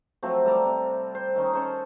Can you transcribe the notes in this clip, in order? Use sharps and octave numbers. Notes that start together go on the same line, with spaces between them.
F3 F#3 A3 C4
G3 A4 A#5 D6
C3
C5
D#3 C#4 D#4
C#4 A4 C5